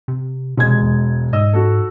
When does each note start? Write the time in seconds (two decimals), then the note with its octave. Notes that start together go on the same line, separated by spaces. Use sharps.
0.08 C3
0.57 E1 C3 G#3 G#6
0.83 E2
1.33 G#2 D#5 E6
1.53 F#4 A4